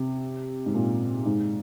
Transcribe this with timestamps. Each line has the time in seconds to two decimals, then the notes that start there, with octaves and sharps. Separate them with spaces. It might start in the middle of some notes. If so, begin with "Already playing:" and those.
Already playing: C3
0.66 G#2
0.74 A#2
1.26 G#2